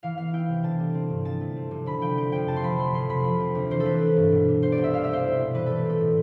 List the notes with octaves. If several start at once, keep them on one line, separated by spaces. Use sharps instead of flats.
E3 F5
B3 F5
E4 G5
C3
D3 A5
G3
C4
G2
F3 A5
A3
C4
C3
D3 B5
F3 G5
C4 G5
F2 G5
C3 A5
C6
F3 B5
A3 C6
F2 C6
C3 B5
F3
C4
D2
E3 C5
A4
A3 B4
D4
G2
B2
G3
B3 C5
D5
C2
E5
G3 F5
E5
C4 C5
E4
B2
E3 B4
A3 A4
C4 A4
A2